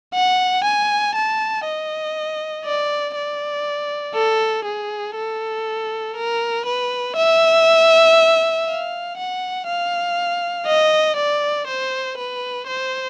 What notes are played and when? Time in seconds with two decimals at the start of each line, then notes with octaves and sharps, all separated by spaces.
0.14 F#5
0.64 G#5
1.15 A5
1.65 D#5
2.65 D5
3.16 D5
4.15 A4
4.65 G#4
5.16 A4
6.17 A#4
6.66 B4
7.16 E5
8.67 F5
9.17 F#5
9.67 F5
10.66 D#5
11.17 D5
11.67 C5
12.18 B4
12.67 C5